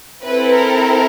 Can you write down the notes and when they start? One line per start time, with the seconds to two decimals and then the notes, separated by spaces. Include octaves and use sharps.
0.24 C4 E4 A4 B4
0.53 A#4